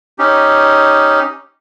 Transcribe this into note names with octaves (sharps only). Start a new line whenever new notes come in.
C#4 D#4 G4